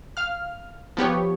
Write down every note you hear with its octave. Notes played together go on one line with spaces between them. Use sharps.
F5 F6
F3 B3 G4 C#5